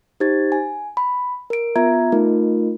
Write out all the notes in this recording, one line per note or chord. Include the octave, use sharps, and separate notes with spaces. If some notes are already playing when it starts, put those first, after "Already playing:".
D#4 G4 C5 G#6 A6
G#5
B5
A#4 D7
B3 F4 E5 A#5 G#6
A3 D#4 F4 A#4